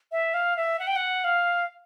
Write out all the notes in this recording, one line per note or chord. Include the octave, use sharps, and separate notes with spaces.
E5
F5
E5
F#5
G5
F#5
F5